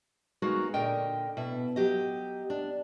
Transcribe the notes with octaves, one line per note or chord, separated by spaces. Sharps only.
G#3 A#3 B3 D#4 F#4 G#4
A#2 D3 A#4 D#5 G5
B2 E4 E5
F#3 G4 D#5
D4